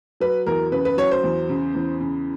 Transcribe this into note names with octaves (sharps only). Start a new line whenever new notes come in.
F#3 B4
E2 A#4
C#3 B4
B4
F#3 C#5
C5
E2
C#3
E2
C#3